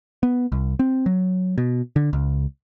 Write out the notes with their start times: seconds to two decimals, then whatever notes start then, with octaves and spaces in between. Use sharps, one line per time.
0.23 B3
0.52 C2
0.79 C4
1.06 F#3
1.58 B2
1.96 D3
2.13 C#2